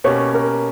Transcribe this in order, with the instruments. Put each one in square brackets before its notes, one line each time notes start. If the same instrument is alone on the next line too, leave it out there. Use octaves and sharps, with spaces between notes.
[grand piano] B2 A#3 C#4 G4 [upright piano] C#5
[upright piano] A#4